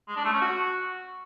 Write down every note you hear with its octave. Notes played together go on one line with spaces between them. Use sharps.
G#3
D4
A3
C#4
F#4